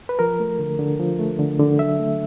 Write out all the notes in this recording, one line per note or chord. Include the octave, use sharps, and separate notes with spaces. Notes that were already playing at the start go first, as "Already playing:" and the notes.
B4
F3 A#4
A3
D3
D3
F3
A3
D3
D3
F#3 E5
A3